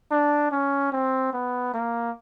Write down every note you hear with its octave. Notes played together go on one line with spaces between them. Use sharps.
D4
C#4
C4
B3
A#3